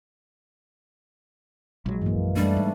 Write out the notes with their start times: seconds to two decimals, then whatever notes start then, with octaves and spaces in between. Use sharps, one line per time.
1.86 A#1 F#3 G#3
2.02 G2 E3 A#3
2.15 F#2
2.36 G3 A3 D4
2.57 G#2